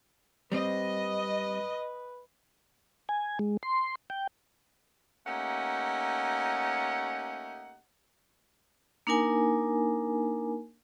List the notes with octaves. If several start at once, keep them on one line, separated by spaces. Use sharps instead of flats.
G3 C4 B4 D#5
G#5
G#3
C6
G5
A3 A#3 C#4 D#4 G4 F#5
A#3 D4 D#4 A#4 G#5